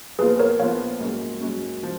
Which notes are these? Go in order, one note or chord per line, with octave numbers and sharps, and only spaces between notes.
A#1 A#2 F3 B3 F4 G#4 B4
A#4 C#5
A#1 A#2 F3 B3 F4 C#5 F5
G#2 F#3 A#3 C#4
G#2 F#3 A#3 C#4
F3